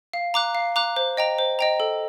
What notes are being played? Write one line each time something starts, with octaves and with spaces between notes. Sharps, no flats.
F5
A#5 D6 F#6
F5
A#5 D6 F#6
C5
D#5 G5 A#5
C5
D#5 G5 A#5
A4